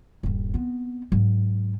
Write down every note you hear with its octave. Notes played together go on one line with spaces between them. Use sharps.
D#1 G2
B3 C4
G#2 F#3